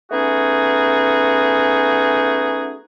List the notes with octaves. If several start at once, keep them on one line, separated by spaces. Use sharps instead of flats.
A3 B3 C#4 D#4 F#4 G#4